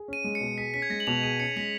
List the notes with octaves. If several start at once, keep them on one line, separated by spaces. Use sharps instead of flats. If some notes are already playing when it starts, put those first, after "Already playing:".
Already playing: G#4
C#4 D#7
G#3
C#7
B2
G#4 B6
C#4 B6
G#6
G#3 A#6
F#7
B2 F7
G#4 D#7
C#4 C#7
G#3 B6